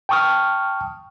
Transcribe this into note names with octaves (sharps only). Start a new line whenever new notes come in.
G5 A5 C#6 D#6 F6